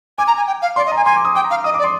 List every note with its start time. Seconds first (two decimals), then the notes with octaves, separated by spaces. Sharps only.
0.18 G#5 D6
0.27 A#5
0.37 G#5
0.47 G5
0.62 F5
0.76 D5 C6
0.86 D#5
0.92 G#5 A#5
1.06 G#5 C6
1.16 D6
1.25 D#6
1.35 G5 D6
1.44 A#5
1.50 F5
1.64 D#5 D#6
1.74 D5 D6
1.84 C6